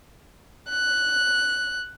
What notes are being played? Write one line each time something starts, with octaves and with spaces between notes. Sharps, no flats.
F#6